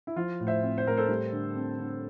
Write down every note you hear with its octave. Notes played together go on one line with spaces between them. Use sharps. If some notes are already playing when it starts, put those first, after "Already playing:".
E4
F3 F4
A2
C5 E5
C4
C5
A2 A#4
A4 C5
G3
D3
C4
D3